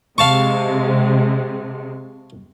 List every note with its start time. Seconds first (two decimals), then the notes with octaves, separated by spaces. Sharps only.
0.18 C3 G#3 F5 A5 C#6